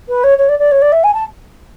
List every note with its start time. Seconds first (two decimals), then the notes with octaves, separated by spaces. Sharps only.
0.08 B4
0.24 C#5
0.38 C#5
0.49 D5
0.59 D5
0.71 C#5
0.82 D5
0.92 E5
1.04 G#5
1.14 A5